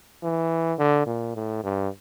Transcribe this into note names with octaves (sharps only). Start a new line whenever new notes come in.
E3
D3
A#2
A2
G2